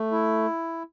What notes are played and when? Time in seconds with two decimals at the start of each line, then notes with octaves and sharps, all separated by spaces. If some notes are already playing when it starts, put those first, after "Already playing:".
Already playing: A3
0.12 E4